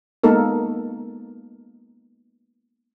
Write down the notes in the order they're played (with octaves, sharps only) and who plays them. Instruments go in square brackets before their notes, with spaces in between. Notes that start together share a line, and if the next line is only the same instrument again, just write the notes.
[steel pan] G#3 A#3 B3 D#4 A4 A#4